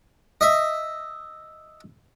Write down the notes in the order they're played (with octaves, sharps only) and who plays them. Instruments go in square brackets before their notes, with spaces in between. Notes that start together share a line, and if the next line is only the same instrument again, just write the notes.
[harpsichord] D#5 E5